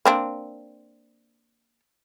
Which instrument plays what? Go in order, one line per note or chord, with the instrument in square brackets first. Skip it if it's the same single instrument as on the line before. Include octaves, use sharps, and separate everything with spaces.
[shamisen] A#3 C4 D4